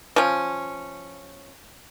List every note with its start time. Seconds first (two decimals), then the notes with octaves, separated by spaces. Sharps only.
0.16 F3 C#4